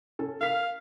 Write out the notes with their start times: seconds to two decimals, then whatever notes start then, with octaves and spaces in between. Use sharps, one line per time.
0.19 C#4 A4
0.41 A#4 F5 B6